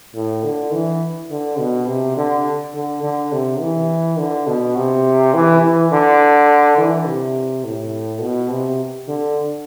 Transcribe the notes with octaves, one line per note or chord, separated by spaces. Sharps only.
A2
D3
E3
D3
B2
C3
D3
D3
D3
C3
E3
D3
B2
C3
E3
E3
D3
E3
C3
A2
B2
C3
D3